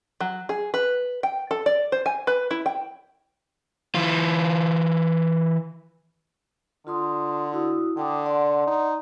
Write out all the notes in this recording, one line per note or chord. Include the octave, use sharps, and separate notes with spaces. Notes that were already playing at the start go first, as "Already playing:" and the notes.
F#3
G#4
B4
G5
A4
D5
C5
G#5
B4
E4
G5
E3 F4
D3 F4 C6 D#6
E4 F#4 D#6
D3 G5 D6 D#6
D5 F#5 C6
D#4